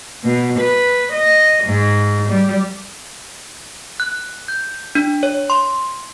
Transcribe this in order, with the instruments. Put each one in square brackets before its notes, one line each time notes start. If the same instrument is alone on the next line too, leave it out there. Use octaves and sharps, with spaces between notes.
[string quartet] B2
B4
D#5
G#2
G3
[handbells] F#6
G6
D4
C#5
C6